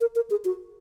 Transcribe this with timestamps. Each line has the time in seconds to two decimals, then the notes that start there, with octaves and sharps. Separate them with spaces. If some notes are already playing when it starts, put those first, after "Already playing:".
0.01 A#4
0.16 A#4
0.30 G#4
0.45 F#4